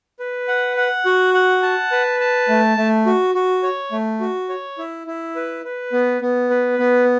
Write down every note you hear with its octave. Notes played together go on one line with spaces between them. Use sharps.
B4
F#5
F#5
F#4
F#5
A5
B4
A5
A3
A3
F#4
F#4
C#5
A3
F#4
C#5
E4
E4
B4
B4
B3
B3
B4
B3